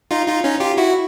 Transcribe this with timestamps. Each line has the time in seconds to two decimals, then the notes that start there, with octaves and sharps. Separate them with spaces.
0.11 D#4 F4
0.28 D#4 F4
0.44 C#4 D#4
0.60 F4 G4
0.77 E4 F#4